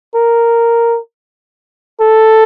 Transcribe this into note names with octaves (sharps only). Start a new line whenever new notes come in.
A#4
A4